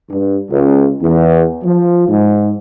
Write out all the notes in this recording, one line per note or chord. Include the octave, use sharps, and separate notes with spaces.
G2
C#2
E2
F3
G#2